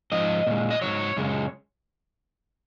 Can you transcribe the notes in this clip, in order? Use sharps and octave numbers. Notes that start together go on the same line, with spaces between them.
G#2 F3 D#5
A#2 G#3
D#5
G#2 D#3 F#3 C#5
F#2 C#3 G#3